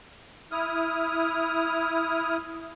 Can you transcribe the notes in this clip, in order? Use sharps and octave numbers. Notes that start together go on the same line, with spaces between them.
E4 D#6 F6